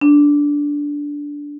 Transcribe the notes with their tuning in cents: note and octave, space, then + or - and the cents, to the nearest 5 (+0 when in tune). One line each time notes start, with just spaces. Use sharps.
D4 -10